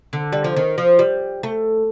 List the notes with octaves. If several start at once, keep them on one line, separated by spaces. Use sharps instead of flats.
D3
G3
F3
D#3
F3
G3
A3